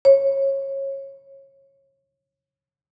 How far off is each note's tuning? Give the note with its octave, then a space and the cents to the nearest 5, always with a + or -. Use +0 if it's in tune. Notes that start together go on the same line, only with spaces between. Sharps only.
C#5 -25